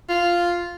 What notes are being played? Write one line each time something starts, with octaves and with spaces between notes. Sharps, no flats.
F4